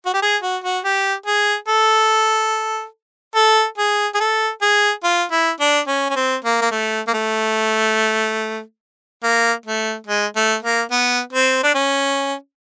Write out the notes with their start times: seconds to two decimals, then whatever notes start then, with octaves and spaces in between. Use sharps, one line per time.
0.06 F#4
0.14 G4
0.22 G#4
0.42 F#4
0.64 F#4
0.85 G4
1.26 G#4
1.68 A4
3.36 A4
3.78 G#4
4.15 G#4
4.20 A4
4.62 G#4
5.04 F4
5.31 E4
5.60 D4
5.87 C#4
6.10 C#4
6.16 C4
6.44 A#3
6.62 A#3
6.71 A3
7.07 A#3
7.14 A3
9.23 A#3
9.66 A3
10.07 G#3
10.36 A3
10.63 A#3
10.91 B3
11.33 C4
11.63 D4
11.75 C#4